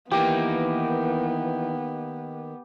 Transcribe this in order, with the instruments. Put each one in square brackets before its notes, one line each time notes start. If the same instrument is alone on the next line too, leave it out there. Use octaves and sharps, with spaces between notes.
[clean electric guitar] D#3 A#3 D#4 [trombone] E3 [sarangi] B3 [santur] G4